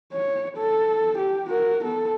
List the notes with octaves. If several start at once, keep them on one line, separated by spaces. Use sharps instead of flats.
C#5
A4
G4
F#4 A#4
B3 A4